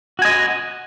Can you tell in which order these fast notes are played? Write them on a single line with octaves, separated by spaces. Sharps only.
F#4 G#5 D#5